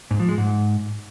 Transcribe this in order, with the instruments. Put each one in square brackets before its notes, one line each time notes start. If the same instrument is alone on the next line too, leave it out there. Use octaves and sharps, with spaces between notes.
[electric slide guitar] G#2
F3
G#3
G#2